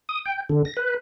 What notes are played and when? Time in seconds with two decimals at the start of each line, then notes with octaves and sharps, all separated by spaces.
0.09 D#6
0.26 G5
0.49 D3
0.65 A#6
0.77 B4